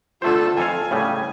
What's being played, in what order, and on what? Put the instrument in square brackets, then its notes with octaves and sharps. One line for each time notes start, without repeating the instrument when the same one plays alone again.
[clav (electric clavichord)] D3 A3 C5 [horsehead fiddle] F4 A4
[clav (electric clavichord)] F2 A4 F5 [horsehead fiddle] G#5
[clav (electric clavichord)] A2 C#3 G3